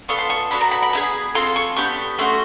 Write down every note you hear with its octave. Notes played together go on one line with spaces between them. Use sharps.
B3 D4 F4 A4 C#6
C6
C#6
B3 D4 F#4 A4 B5
A#5
B5
B5
B3 E4 G#4
C4 F4 A4 C6
C#6
B3 D4 G4 C#6
A3 C#4 F#4 C6